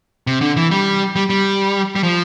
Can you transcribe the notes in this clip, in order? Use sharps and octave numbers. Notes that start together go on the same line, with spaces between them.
C3
D3
E3
G3
G3
G3
G3
F3